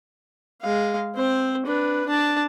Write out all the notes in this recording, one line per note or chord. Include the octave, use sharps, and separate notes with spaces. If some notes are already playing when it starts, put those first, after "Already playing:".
G#3 F5
C4 C5
D4 B4
D4 A5